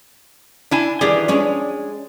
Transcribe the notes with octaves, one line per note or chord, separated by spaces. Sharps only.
D4 E4 G#5
D#3 E3 D4 G4 G#4 D5
G#3 C#4 D4